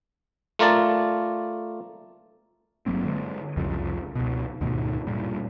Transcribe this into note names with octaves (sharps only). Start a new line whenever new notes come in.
A3 F4 A#4 D5 A5
G1 F#3 A#3 C4
D3 G#3
C2 F2 C#3 F3
C#2 B2
D2 G#2 B2 D#3
G2 A#2 G3